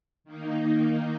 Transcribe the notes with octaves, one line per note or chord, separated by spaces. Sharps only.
D#3 A#3 D#4